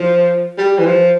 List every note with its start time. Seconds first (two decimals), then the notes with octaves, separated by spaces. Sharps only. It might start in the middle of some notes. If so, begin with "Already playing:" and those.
Already playing: F3
0.58 G3
0.79 E3
0.86 F3